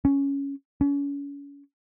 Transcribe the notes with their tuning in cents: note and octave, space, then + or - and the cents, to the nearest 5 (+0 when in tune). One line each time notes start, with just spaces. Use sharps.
C#4 +5
C#4 +35